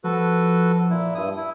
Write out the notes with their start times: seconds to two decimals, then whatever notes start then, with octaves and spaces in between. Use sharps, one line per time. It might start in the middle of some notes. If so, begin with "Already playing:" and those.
0.04 F3 F#4 A4 B4
0.90 A#2 E4
1.15 G2 D#6
1.37 E4